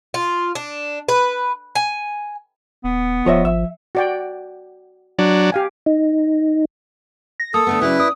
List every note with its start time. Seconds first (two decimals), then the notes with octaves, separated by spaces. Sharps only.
0.14 F4
0.55 D4
1.08 B4
1.75 G#5
2.84 D#1 B3
3.26 D1 F3 C#5 D#5 E5
3.45 G#1 E5
3.95 F#4 D5 G5
5.19 F#3 D4
5.52 G4 F5 G#5
5.86 D#4
7.40 A#6
7.54 A#3 A4 D#6
7.67 D3 A3 B3
7.81 C#3 F#3 E4 B4 D5
8.00 D5 D#6